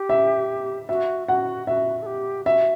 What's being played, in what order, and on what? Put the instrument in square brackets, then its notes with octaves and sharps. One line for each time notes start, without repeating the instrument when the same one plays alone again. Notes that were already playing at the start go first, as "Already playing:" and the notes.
Already playing: [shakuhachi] G4
[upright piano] E5
[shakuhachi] F#4 [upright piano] E5
[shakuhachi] F#4 [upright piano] F#5
[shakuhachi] F#4 [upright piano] E5
[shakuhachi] A4
G4
[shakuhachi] F#4 [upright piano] E5